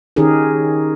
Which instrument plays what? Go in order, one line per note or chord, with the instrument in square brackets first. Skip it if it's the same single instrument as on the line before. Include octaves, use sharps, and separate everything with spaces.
[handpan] D#3 C#4 D#4 G4 G#4 A#4